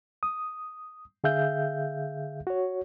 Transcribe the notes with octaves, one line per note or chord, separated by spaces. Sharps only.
D#6
D3 G#4 E5 F5 G6
F#4 C#5